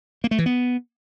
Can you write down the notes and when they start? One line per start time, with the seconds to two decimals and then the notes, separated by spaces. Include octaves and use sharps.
0.24 A#3
0.31 A3
0.39 E3
0.46 B3